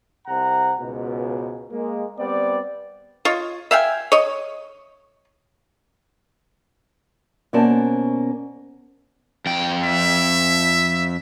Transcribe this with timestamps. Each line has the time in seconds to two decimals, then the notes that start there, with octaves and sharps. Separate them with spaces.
0.27 C2 C3 C5 F#5 A#5
0.80 C#2 G#2 B2
1.72 G#3 A#3
2.19 G3 B3 C4 D5
3.25 F4 C#5 D#5
3.71 E5 F5 G5 G#5
4.12 C#5 D#5
7.53 B2 A#3 C#4 C5 D5 A5
9.46 F2 G5
9.84 E5